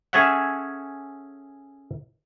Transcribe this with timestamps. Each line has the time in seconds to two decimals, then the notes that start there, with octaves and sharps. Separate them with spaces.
0.13 C#4 G#4 A4 C#5 E5 F#5